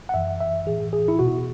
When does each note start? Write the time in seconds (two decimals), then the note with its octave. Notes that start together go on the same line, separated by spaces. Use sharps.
0.09 F#5
0.14 F#2 E3 E5
0.40 E5
0.66 A2 E3 G#4
0.93 G#4
1.08 E4
1.19 E2 B2 F#4